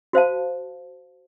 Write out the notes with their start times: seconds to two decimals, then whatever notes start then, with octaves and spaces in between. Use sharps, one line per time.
0.13 F#4 C5 F5 A5